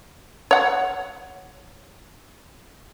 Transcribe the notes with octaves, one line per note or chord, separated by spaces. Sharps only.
C#5 F#5